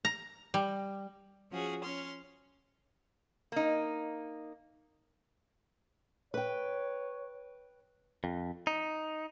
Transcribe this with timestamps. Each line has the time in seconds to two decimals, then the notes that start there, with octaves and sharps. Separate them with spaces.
0.05 A#5
0.54 G3
1.51 F3 C#4 F#4 G#4
1.83 C#4 C6 F6
3.52 A#3 D#4
6.34 B4 C#5 G5
8.24 F2
8.67 D#4